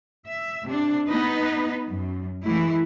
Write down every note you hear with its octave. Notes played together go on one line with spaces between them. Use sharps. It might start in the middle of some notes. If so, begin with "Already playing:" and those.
E5
C3 D4
B3 D#4 B4
F#2
E3 G#3 A3 E4